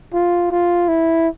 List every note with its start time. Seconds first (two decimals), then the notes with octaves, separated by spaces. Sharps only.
0.14 F4
0.51 F4
0.88 E4